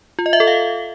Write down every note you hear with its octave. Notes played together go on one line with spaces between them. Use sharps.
F4
D#5
E5
A4
F5